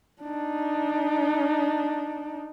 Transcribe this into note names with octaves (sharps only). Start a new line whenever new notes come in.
D4 D#4